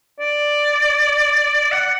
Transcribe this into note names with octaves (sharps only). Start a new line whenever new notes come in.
D5
F#5